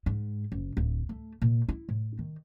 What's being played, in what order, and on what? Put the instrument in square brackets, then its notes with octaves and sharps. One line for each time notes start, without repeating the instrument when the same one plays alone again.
[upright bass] G#2
F#1
D1
A3
A#2
E4
A2
D#3